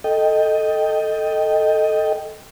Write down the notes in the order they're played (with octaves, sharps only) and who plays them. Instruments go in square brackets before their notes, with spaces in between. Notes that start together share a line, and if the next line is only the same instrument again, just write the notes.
[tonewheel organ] A4 D#5 G5